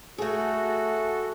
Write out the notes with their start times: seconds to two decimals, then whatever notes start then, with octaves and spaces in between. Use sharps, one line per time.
0.18 A3 F#4 G#4 A4